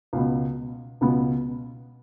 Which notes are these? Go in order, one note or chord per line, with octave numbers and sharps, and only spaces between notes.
C#2 B2 B3
C#2 B2 B3